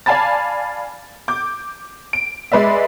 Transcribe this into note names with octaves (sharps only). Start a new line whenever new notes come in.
D5 F5 G#5 A5 B5 A6
D6 G6
D7
G#3 B4 D5 E5